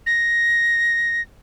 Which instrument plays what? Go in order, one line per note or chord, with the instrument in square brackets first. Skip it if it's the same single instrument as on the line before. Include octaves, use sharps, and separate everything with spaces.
[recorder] A#6